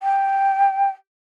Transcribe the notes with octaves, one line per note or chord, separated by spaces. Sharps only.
G5